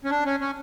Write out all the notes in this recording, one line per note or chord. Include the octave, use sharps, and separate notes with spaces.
C#4
D4
C#4
C#4